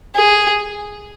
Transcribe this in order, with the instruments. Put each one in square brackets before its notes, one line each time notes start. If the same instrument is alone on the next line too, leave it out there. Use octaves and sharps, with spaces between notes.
[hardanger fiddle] G#4